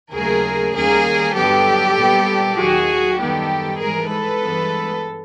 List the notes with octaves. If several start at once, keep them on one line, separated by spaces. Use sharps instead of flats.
D#2 C#3 F#3 A3 G#4 A#4
D#2 D#3 G3 A#3 C#4 G#4 A#4
G2 D3 F#3 B3 G4 A4
A#2 G3 B3
D#2 D#3 F#3 F#4 G#4
F#2 D#3 G3 B3 G4 A4
G#2 E3 G#3 G#4 A#4
A4 B4
G2 E3 G#3 B3